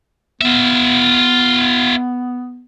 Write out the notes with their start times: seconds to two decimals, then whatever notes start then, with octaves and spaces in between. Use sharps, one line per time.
0.41 B3 F4 E5